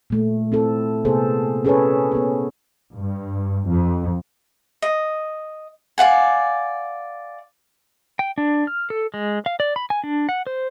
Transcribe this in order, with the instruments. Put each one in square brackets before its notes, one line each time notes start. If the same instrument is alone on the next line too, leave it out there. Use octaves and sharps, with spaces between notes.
[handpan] A#2 A3
C4 E4 A4
C3 A#3 B3 G#4 A4 C5
C#4 G#4 A4 B4 C#5
B3 G#4
[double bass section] G2
F2
[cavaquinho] D#5
D5 F5 F#5 G#5
[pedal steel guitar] G5
D4
F6
A4
G#3
F5
D5
B5
G#5
D4
F#5
C5